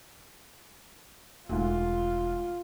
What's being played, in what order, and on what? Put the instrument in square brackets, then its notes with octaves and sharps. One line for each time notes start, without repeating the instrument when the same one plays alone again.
[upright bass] E1 [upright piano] D2 G#2 [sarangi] F4